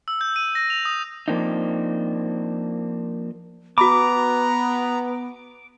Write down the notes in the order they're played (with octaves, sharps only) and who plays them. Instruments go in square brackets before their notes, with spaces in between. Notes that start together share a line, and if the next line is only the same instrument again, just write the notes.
[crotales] E6
G6
D#7
A#6
F7
D#6
[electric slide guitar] F3 A#3 C4 D4 D#4
[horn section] B3 [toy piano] F#4 B5 [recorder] A#5 [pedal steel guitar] D6